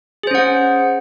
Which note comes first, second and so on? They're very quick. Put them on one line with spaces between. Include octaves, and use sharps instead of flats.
G#4 C5 C#4 F#5